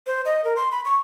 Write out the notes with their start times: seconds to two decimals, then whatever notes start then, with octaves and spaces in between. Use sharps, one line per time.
0.07 C5
0.25 D#5
0.44 A#4
0.56 C6
0.72 B5
0.85 C#6